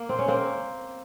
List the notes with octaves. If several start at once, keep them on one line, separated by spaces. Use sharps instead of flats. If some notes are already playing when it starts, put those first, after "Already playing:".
Already playing: A#3
C4
C#4
A#3 C4